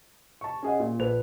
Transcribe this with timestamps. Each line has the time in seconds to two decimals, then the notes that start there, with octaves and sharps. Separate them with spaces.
0.41 A5 C#6
0.63 C#4 G#4 D#5 F#5
0.80 A#2
0.99 A#1 A4 B4 F7